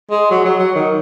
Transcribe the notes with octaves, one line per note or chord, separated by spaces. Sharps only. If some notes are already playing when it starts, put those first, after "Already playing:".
G#3
F#3
F#3
F#3
D#3